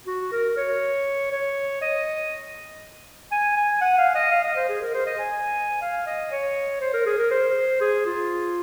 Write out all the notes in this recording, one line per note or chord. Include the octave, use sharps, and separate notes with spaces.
F#4
A#4
C#5
C#5
D#5
G#5
G#5
F#5
F5
D#5
F5
D#5
C5
G#4
A#4
C5
D#5
G#5
F5
D#5
C#5
C5
A#4
G#4
A#4
C5
G#4
F4